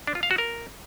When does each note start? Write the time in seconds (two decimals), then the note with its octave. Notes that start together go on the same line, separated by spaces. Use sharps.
0.07 D4
0.15 F4
0.23 F5
0.31 F#4
0.38 A#4